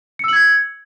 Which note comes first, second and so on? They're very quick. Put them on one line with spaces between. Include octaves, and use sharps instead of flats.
C#7 E6 F#7 G#6